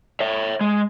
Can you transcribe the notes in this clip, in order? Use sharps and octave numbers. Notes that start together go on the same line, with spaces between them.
C#5 E5
G#3